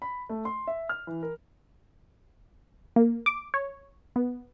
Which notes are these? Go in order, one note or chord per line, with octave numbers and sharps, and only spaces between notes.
B5
A3
C6
E5
F6
E3
A#4
A#3
D6
C#5
B3